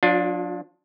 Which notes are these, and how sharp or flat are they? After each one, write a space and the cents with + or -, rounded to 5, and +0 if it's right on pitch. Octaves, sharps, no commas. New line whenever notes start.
F#3 -40 D4 +0 F4 +20